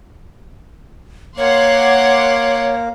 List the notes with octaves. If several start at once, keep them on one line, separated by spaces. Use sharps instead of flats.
A#3 C#5 F#5 C6 D6